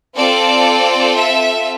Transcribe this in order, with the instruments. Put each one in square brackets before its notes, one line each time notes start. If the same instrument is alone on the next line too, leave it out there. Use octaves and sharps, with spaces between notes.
[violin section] C4 F4 A4 D5
E5